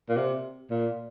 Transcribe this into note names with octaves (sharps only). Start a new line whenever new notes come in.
A#2
C3
A#2